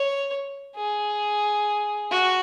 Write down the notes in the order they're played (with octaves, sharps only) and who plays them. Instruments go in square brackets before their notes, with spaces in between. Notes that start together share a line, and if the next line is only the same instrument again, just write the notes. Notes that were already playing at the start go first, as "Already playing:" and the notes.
Already playing: [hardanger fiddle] C#5
G#4
F#4